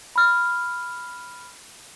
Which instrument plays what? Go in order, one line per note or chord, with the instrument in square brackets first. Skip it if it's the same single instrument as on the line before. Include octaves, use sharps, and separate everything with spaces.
[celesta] B5 F6